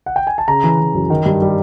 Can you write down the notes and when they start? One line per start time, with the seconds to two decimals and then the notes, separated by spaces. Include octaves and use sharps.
0.06 F#5
0.16 G5
0.27 G#5
0.38 A5
0.48 C#3 A#5
0.64 E3
0.80 E3
0.94 F#2
1.10 D#3
1.26 G2
1.42 G3